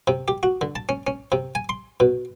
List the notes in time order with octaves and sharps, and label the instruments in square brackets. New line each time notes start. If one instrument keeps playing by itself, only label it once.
[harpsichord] C3
G4
F#4
D3
A5
C#4
C#4
C3
G#5
C6
B2